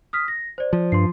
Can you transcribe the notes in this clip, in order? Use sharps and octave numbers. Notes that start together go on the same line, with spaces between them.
D#6 F6 B6
A#6
C5 D5
F3
G2 C6 C7